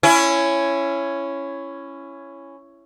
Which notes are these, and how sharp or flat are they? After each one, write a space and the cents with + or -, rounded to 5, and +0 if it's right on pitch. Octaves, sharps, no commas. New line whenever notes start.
C#4 +0 E4 +20